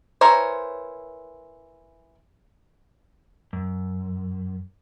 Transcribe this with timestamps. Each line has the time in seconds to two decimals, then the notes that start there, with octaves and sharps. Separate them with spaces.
0.21 E3 A#4 C5 C#5
3.53 F#2